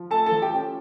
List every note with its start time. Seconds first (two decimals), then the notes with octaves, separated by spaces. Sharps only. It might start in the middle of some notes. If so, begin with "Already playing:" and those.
Already playing: F3
0.10 A3 A4 A5
0.26 A4 A5
0.32 F3
0.42 G4 G5
0.53 C#4